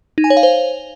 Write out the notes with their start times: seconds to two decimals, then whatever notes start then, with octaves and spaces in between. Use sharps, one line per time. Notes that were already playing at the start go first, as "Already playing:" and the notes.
0.18 D#4
0.24 G#5
0.30 C#5
0.37 F5
0.43 C5